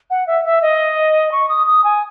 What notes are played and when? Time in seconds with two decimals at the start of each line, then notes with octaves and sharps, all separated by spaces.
0.10 F#5
0.27 E5
0.45 E5
0.62 D#5
1.32 C#6
1.49 D#6
1.67 D#6
1.84 G#5